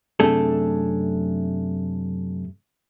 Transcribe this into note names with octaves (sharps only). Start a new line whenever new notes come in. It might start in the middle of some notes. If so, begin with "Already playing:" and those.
F#2 C3 A3 D4 G#4 A4